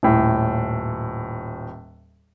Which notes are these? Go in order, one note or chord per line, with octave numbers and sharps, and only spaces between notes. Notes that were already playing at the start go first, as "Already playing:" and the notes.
D#1 A2